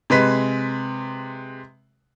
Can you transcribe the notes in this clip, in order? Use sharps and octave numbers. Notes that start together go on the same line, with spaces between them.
C3 G#3 B4 B6